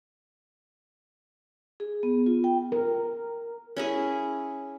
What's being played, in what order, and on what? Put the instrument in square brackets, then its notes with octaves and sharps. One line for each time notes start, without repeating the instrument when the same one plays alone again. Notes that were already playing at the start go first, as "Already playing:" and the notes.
[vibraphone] G#4
B3
F4
G5
[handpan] A#4
[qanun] C#4 E4 G#4